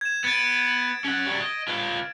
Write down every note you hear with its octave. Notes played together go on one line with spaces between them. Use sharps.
G#6 E7
B3 A6 D7
C#4 F#5
G3 F#4
D#5
F4 B4